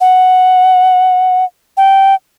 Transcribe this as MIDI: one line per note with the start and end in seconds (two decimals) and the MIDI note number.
0.01 1.45 78
1.77 2.15 79